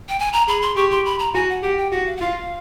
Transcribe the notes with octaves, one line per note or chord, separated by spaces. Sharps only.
G5
G#5
A#5
G#4 B5
C6
G4 C#6
C6
B5
A#5
F#4 G#5
F#5
G4 F#5
G5
F#4 F#5
F5
F#5
F4 F5